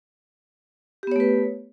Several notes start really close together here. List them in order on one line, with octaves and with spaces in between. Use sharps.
G4 B3 C#5 A3 B4